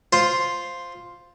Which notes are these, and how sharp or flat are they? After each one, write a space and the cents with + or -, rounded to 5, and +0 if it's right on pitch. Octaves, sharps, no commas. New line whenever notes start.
F4 +0 C5 +0